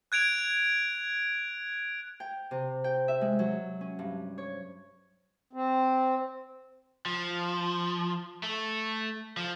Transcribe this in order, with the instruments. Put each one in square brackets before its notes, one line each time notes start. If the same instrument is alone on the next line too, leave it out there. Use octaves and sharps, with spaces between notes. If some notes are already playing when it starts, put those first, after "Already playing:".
[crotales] F#6 G#6 D7 F7
[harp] G5
C3
G5
E5
G#3
F#3
C#4
G2
C#5
[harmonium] C4
[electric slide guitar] F3
A3
F3